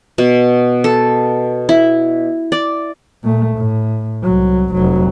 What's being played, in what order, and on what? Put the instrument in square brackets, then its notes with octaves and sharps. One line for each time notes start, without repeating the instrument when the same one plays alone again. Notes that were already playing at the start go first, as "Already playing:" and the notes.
[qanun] B2
A4
E4
D5
[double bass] A#2 A3
A2
C2 F#3
F1 F#3